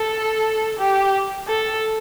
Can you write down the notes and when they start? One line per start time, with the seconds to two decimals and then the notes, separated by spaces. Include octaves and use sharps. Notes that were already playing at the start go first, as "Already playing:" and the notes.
Already playing: A4
0.79 G4
1.47 A4